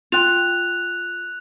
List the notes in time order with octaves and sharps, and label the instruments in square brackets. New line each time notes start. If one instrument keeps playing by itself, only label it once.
[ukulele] F4 G5 [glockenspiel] F#6 F7